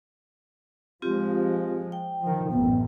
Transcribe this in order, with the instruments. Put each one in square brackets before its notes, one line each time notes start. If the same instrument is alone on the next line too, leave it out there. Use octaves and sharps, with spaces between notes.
[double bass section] F3 G#3 [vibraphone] C4 F4 G4
[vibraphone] G5
[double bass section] D#3 F3
[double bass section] A1 F#2 [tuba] B3